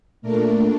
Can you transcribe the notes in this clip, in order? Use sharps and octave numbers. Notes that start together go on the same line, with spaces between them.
A#2 A3 D4 A#4